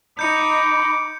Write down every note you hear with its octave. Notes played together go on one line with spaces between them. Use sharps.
D#4 B5 D6 G6 C#7